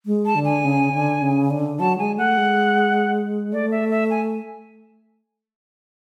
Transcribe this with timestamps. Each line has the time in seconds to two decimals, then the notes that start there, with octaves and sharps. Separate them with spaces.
0.06 G#3
0.26 A5
0.35 D3
0.45 G#5
0.64 C#3
0.93 D3
1.22 C#3
1.50 D3
1.80 F#3 A5
1.99 G#3 G#5
2.17 A3 F#5
2.37 G#3
3.53 A3 D5
3.71 E5
3.91 E5
4.10 G#5